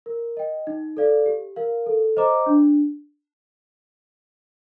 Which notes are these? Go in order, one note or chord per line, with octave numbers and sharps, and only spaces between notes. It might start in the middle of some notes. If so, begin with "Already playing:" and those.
A#4
D#5 G5
D#4
A4 D5 F5
G4
A#4 F5
A4
C5 D#5 A#5 D6
D4